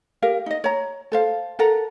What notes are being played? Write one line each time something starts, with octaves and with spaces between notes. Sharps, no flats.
G4 A#4 F5
D#4 D#5
C#5 A#5
A4 C5 F5
A4 A#4 F#5 A#5